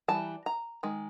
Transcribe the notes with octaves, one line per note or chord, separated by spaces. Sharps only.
E3 G3 A5
A#5
D#3 G#3